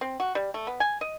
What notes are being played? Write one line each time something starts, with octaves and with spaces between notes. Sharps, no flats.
C4
F#4
G3
A3
B3
G#5
D#5